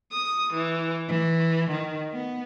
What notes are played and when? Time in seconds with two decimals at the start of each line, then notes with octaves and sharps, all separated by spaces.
0.12 D#6
0.54 E3
1.08 E3
1.71 D#3
2.12 B3